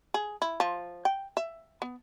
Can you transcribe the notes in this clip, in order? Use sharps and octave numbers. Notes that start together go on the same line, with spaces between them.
G#4
E4
F3
G5
E5
B3